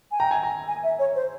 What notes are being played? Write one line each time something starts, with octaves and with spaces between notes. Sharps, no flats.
G#5
G5 A#5
G#5
A#5
G#5
E5
C#5
C5